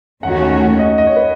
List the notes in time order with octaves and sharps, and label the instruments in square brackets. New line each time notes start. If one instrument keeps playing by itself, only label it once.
[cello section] D#2 D#3 A3 C#4 F#4 [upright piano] F#5
[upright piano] F#5
F#5
D#5
D#5
C#5
B4